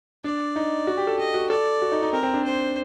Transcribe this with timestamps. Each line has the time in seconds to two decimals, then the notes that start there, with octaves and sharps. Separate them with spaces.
0.24 D4 D5
0.56 D#4
0.87 F#4
0.97 G4
1.07 A4
1.18 G4 D#5
1.34 F#4
1.50 A4 D5
1.82 F#4
1.92 D#4
2.02 D#4
2.13 C4 A#4
2.23 C4
2.34 D4
2.44 C5